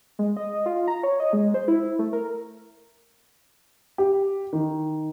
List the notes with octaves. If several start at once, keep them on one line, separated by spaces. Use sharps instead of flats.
G#3
D#5
F4
A#5
C#5
D#5
G#3
C5
E4
A3
A#4
G4
D#3